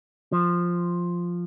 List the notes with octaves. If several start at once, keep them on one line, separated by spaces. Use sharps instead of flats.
F3